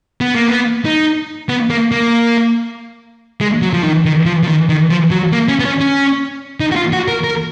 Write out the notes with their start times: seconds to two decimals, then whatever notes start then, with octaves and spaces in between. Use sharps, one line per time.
0.21 B3
0.35 A#3
0.48 B3
0.85 D#4
1.49 B3
1.70 A#3
1.91 A#3
3.41 G#3
3.62 F#3
3.73 F3
3.83 D#3
4.05 D#3
4.26 F3
4.43 F3
4.48 D#3
4.69 D#3
4.90 F3
5.11 F#3
5.33 A#3
5.48 C#4
5.60 B3
5.65 C#4
5.81 C#4
6.60 D#4
6.72 F#4
6.76 F4
6.93 F#4
7.08 A#4
7.24 A#4